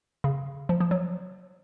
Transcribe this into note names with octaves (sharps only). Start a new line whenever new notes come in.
C#3
F3
F3
F#3